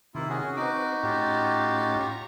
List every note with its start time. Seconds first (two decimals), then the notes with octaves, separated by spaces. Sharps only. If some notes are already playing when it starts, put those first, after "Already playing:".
0.15 C3 D#3 A#3 E4 F4
0.29 C#4 F#4 G#4
0.57 C4 D#4 F#4 B4 D6
1.03 A2 C#4 F4 G4 A6
2.01 A#5 C#6